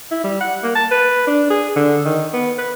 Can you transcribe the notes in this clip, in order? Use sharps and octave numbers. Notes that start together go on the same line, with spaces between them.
E4
G3
F#5
A#3
A5
B4
D4
G#4
D3
D#3
B3
B4